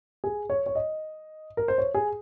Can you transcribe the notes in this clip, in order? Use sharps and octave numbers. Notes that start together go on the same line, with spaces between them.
G#4
C#5
C#5
D#5
A#4
C5
C#5
G#4